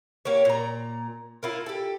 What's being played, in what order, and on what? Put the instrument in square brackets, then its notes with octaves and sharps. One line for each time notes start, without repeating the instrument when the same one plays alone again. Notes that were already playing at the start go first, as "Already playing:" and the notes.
[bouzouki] A#3 G4 C#5
A#2 A#5
A#3 E4 F4
G4 A4